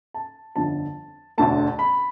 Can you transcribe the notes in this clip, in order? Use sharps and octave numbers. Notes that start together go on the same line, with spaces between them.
A5
G1 F2 D3 A5
E1 D2 D3 A3 A5
B5